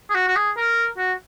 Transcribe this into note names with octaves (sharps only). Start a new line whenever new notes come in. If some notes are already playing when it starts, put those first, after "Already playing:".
G#4
F#4
F#4
G#4
A#4
F#4